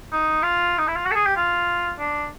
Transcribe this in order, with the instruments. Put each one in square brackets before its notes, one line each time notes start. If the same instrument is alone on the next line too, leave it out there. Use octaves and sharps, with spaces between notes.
[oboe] D#4
F4
D#4
E4
F4
F#4
A4
G#4
G4
F4
D4